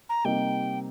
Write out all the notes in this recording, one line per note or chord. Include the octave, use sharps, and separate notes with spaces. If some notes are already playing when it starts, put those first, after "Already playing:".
A#5
C3 G3 A#3 D#4 G4 G5